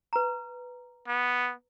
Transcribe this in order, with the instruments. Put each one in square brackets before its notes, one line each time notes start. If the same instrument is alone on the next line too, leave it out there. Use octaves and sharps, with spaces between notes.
[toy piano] B4 A#5
[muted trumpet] B3